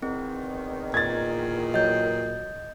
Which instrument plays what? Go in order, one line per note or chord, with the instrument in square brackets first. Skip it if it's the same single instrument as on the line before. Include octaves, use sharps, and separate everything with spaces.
[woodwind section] E2 D#3 [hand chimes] C4
[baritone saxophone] A#2 [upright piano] G#6 A6
[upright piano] F#3 [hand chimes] D#5 G6